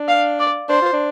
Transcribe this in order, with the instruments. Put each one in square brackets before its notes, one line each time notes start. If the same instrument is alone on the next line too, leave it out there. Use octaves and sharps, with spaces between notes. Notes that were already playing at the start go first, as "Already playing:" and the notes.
Already playing: [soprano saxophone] D4
[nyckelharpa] F5
D5
[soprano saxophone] D4 [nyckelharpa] C5
[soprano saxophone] F4
D4